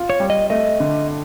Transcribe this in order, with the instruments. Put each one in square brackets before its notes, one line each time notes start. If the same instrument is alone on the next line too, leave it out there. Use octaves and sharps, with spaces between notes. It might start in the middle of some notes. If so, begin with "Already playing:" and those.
Already playing: [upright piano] F4
[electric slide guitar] C#5
[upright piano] G3
[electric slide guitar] D#5
[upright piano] A3 [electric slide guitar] D#5
[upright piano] D3